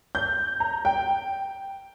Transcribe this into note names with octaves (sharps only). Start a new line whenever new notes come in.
G6
A#5
G5